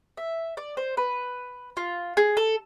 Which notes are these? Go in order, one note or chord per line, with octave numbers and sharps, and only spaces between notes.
E5
D5
C5
B4
F4
G#4
A4